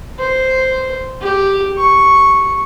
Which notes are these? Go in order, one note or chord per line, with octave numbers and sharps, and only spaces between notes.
C5
G4
C#6